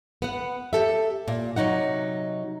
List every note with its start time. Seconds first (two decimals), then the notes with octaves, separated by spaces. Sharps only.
0.22 B3 F#5
0.73 G4 A4 E5
1.28 A#2
1.56 C3 F#3 D#4 F#5